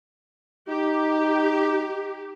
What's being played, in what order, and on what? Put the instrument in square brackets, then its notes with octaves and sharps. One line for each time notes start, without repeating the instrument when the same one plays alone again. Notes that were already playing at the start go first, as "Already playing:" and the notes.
[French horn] D#4 [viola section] G4